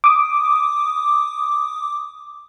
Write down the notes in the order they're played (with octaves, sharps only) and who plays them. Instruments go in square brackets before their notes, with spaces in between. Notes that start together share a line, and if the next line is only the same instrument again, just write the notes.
[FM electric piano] D6 D#6